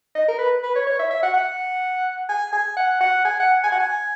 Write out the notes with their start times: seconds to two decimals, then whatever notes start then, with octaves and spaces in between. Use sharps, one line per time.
0.15 D#5
0.28 A#4
0.39 B4
0.63 B4
0.76 C#5
0.87 C#5
0.99 E5
1.11 E5
1.23 F#5
1.34 F#5
2.29 G#5
2.53 G#5
2.77 F#5
3.01 F#5
3.25 G#5
3.40 F#5
3.64 G#5
3.72 F#5
3.80 G#5